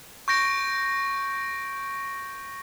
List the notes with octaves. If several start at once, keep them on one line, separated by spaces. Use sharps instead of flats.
C#6 G6 A#6 D7